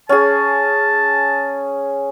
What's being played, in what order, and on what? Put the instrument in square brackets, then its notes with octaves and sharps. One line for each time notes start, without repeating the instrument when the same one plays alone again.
[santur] C#4 G#4 [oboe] A5